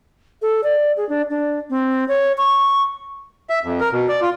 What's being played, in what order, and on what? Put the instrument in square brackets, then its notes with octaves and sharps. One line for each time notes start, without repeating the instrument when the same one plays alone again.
[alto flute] A4
D5
G#4
D4
D4
C4
C#5
C#6
[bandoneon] E5
F2
A#4
B2
D5
F4